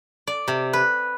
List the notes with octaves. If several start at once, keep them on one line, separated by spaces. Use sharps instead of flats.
D5
C3
B4